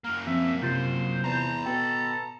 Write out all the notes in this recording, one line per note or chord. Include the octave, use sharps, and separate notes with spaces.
F#2 A#3 A#4
F3 C4 E5
C3 F4 C5 A6
E2 A5 A#5
B2 A4 G5